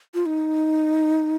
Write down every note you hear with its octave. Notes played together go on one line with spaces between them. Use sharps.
F4
D#4